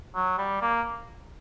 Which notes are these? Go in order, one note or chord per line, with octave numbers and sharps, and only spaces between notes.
F#3
G3
A#3